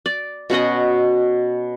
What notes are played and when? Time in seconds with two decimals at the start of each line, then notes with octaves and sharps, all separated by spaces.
0.06 D5
0.50 B2 C#4 F#4 D#5